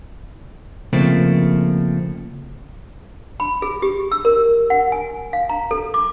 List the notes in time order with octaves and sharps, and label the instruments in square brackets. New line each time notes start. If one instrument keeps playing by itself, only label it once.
[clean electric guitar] C#3 F3 A3 A#3 C4
[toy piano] B5
G#4
G4
E6
A#4
F#5
G#5
F5
A#5
A4
D6